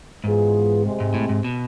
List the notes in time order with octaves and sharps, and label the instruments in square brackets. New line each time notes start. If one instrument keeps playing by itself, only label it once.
[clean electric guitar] G#2 [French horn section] E3 B3 F4 G#4
[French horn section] C3 G#3 C4
[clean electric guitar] G#2
A2
G#2
B2